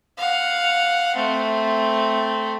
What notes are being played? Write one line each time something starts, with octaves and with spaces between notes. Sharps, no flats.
F5 F#5
A3 C4